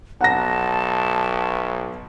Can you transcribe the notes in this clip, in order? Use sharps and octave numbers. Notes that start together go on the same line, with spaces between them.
B1 F#5 A5 A#5 A#6